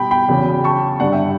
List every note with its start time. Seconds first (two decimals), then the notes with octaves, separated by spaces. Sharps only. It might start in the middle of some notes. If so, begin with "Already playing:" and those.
Already playing: B2 G3 G5 B5
0.11 G5 B5
0.28 E2 C#3 F#3
0.64 A5 C#6
1.00 G2 D3 G3 D5 F#5
1.12 E5 G5